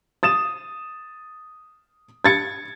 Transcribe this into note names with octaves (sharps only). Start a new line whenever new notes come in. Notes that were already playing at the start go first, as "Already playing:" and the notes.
D#6 A6 E7
G#6 A6 C#7